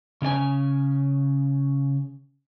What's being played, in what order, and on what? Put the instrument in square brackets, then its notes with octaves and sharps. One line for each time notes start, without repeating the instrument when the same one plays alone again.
[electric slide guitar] C#3 C#4 D5 G#5